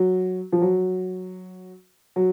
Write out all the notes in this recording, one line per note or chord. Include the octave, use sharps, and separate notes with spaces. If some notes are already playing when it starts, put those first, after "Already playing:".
Already playing: F#3
F3
F#3
F#3